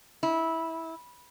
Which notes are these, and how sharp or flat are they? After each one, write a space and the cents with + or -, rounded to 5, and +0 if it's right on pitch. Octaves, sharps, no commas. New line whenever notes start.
E4 -15